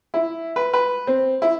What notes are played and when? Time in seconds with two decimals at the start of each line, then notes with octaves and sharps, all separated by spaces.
0.14 E4
0.56 B4
0.73 B4
1.07 C4
1.42 E4